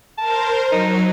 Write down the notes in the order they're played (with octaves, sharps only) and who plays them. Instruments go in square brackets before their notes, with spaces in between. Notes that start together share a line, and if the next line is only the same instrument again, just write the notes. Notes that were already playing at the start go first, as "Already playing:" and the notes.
[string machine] A#4 C5 [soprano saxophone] A5
[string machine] F#3 [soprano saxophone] D#4